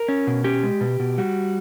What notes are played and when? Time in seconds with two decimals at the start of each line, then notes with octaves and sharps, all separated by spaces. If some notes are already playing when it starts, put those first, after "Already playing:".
Already playing: A#4
0.08 C#4
0.27 B2
0.44 C#4 G4
0.63 G#3
0.81 B2
1.00 B2
1.18 G3 F#4